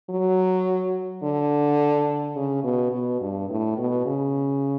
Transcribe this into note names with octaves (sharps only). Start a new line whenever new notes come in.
F#3
D3
C#3
B2
B2
G2
A2
B2
C#3